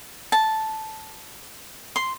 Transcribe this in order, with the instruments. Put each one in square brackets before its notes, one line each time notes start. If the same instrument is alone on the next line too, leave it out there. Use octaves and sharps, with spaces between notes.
[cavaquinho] A5
C6